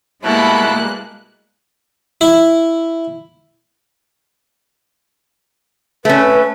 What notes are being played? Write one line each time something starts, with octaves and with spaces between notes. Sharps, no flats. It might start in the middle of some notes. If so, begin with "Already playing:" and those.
B2 G3 G#3 A#3 E4 A4 F#6
E4
A3 C#4 B4